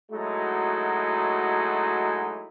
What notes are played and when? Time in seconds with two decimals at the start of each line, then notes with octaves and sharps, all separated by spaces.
0.11 F#3 G#3 A3 D#4 E4 F#4